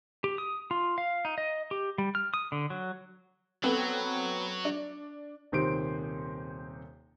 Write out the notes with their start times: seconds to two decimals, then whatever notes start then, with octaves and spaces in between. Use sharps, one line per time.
0.24 G4
0.38 D#6
0.71 F4
0.98 F5
1.25 D#4
1.38 D#5
1.71 G4
1.98 G3
2.15 F6
2.34 D#6
2.52 D3
2.70 F#3
3.64 F#3 B3 C4 A4
4.65 D4
5.52 D#1 C3 D#3 C5 C6 D7